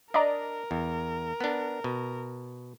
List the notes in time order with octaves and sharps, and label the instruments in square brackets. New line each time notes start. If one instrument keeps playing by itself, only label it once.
[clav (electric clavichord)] D4 [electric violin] A#4 [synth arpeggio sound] D5 D#5 A#5
[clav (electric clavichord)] E2
B3 D4
B2